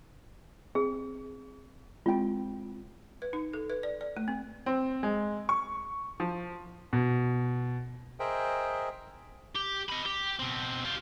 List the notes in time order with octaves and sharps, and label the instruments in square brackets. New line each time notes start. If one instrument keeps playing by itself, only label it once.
[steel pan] C4 [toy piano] G#4
[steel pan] G#3 C4 G5 [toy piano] F4
[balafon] B4
D#4
A4
B4
D5
D5
A3
C4
[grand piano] C4
G#3
C#6
F3
B2
[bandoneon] G#4 A#4 C5 D#5 E5 G5
[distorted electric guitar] G4
D#5 B5
G4
B2 C4
F4 G4